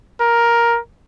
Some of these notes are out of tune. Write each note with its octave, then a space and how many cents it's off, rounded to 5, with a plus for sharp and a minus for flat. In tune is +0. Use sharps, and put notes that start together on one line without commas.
A#4 +10